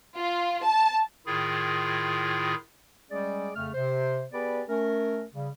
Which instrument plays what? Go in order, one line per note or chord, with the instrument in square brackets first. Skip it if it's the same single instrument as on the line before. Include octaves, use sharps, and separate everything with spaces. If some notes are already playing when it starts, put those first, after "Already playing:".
[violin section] F4
A5
[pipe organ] A2 D#3 E4 F4 G#4
[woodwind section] G3 G#3 C#4 G#4 D5
F2 C#3 A3 F6
C3 C5
B3 G4 G#4 B4 D5
A3 C#4 A#4
C#3 G3